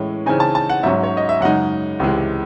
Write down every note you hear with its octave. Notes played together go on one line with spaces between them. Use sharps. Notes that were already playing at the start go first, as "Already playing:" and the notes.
Already playing: A2 E3 G#3 C#4
C#3 E3 C4 D#4 G#5
A5
A5
F#5
G#2 F#3 C#4 E5
C#5
D#5
E5
F#2 C#3 G#3 D#4 F#5
C#2 C3 E3 G#3